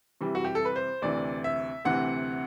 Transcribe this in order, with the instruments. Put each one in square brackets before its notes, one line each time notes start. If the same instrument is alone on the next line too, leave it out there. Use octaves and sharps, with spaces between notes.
[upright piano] C3 E3 G3
F#4
G4
A4
B4
C5
D2 C3 E3 D5
E5
D2 C3 E3 F#5